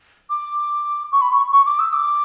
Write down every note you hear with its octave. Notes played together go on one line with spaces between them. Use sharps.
D6
C#6
B5
C#6
C#6
D6
E6
D6